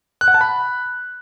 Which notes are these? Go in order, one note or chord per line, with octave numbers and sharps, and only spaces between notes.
F#6
F#5
A5
B5